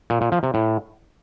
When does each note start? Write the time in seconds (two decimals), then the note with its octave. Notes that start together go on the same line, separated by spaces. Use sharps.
0.10 A#2
0.21 A#2
0.32 F3
0.43 C3
0.54 A2